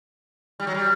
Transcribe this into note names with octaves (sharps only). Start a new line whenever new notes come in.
G3
F#3
G3